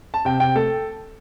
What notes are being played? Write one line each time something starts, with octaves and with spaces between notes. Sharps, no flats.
A5
C3 G5
C3 G5
A3 A4